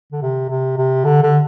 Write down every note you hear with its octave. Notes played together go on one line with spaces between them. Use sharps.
D3
C3
C3
C3
D3
D3